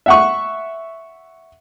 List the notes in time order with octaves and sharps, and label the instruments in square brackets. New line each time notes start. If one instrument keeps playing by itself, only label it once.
[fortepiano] E5 F#5 C#6